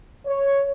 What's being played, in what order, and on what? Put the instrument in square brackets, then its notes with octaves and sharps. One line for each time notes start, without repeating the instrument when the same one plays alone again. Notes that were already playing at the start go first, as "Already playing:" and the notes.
[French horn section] C#5